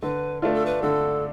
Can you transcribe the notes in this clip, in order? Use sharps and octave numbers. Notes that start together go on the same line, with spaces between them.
D3 B4
A3 D4 F4 B4
A4
B4
D3 A4